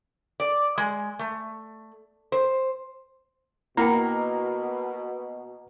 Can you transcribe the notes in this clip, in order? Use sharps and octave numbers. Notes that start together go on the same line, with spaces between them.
D5
G#3
A3
C5
B2 A#3 E4 F#5 G5 A#5 B5